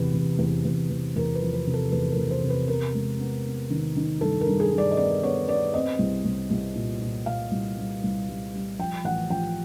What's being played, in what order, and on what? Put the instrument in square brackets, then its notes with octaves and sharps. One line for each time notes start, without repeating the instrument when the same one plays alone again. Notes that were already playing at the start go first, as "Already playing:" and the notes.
Already playing: [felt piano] E2 C3 B4
E2
E2
E2
E2
E2 A#4
B4
F3
B4
C3
A4
E2 B4
A#4
E2
C5
C3
B4
B3 A#4
G#3
B3
B3
D#3
D#3
G2 A4
A#4
G2
G#4
G2
D5
D#5
B3 D5
B3 C#5
B3 D5
C4 D#5
C2
C2
C2
A#2
A#2
A#2 F5
C2
G3
C2
G3
G3
F3 G5
A1 F#5
F3 G5